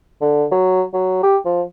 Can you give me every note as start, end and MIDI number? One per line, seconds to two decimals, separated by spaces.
0.21 0.45 50
0.51 0.83 54
0.94 1.20 54
1.23 1.37 67
1.45 1.62 53